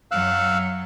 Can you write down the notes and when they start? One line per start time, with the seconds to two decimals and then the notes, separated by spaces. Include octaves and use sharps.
0.11 F#2 F#3 F5 E6 F#6